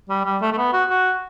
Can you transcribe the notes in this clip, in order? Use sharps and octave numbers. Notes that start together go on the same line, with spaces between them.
G3
G3
A3
A3
B3
F#4
F#4